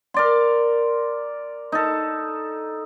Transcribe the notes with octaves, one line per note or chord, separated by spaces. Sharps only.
A#4 D5 C6
D#4 A4